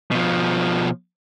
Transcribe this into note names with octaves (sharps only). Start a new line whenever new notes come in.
B2 F3